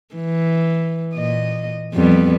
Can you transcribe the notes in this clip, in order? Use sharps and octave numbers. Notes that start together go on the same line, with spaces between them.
E3
A#2 D#5
F2 G3 B3